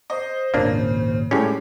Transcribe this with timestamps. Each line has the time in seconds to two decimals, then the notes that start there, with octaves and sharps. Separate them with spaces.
0.10 C5 D#5
0.54 G#1 D#2 A#2 C#3 A#3 D4
1.31 A2 G3 G#3 C#4 G4